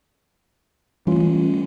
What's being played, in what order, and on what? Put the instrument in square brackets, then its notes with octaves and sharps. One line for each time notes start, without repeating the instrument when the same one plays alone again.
[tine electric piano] E3 C#4 F4 [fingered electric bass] G3 A3